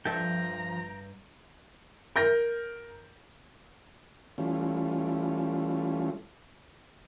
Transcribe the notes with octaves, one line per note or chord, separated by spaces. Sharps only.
G2 F3 A4 E5 G5 A#5
A#4 G6 A#6
E3 G3 A3 C#4 F4